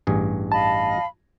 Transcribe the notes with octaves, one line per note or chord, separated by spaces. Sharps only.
A1 G2 G#4
D#5 F5 A5 B5